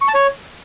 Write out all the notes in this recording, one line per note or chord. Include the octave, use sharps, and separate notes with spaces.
C#6
A5
C#5